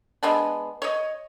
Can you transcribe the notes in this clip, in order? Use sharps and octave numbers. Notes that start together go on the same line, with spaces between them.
G#3 B3 D4
C#5 D#5